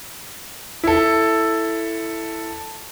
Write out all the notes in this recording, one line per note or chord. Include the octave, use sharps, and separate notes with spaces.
E4 A4